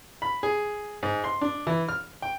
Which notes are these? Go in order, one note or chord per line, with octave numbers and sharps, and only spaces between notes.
B5
G#4
G#2
C6
D4
E3
F6
G5